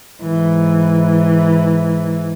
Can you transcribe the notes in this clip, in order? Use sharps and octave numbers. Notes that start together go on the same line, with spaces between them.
G#2 E3